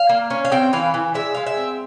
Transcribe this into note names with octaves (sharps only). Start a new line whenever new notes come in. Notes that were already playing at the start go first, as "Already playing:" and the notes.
Already playing: F5
A#3
C#4
F5
C4 G5
E3 F5
E3
G#3 E5
G#3 F5
E5
C4